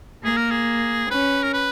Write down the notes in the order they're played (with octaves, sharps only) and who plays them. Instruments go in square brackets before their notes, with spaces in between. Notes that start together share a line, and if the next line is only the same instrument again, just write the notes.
[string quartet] A#3 [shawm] G#4
[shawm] A#4
G#4
[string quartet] C#4 [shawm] B4
[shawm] A#4
B4